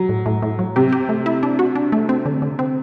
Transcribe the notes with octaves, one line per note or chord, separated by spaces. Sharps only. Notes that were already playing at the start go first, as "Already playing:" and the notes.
Already playing: F#3
A2
A2
A2
F#3
C3 G4
G4
A3
E4
D4
F#4
D4
A3
C4
D3
D3
C4